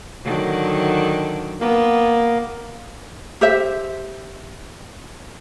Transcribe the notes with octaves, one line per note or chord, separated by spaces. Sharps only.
D3 D#3 F#3
A#3 B3
G4 C5 E5